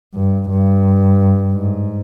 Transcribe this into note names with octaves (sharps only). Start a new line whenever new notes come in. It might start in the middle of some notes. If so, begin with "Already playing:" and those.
G2
G2
G#2